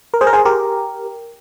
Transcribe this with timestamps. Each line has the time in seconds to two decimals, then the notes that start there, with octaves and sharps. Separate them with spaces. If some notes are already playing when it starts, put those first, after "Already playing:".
0.14 A#4
0.21 G#4 C5
0.27 A#4
0.33 G#4 C5
0.45 G4 A#4